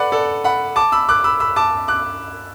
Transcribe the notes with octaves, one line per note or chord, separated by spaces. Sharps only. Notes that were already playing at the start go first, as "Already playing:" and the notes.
Already playing: A4 B4 D5 F#5
A4 D5
F#5 B5
A5 D6
B5 E6
D6 F#6
B5 E6
B5 E6
A5 D6
D6 F#6